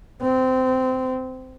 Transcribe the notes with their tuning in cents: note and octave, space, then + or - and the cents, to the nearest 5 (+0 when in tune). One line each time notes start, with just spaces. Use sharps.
C4 -20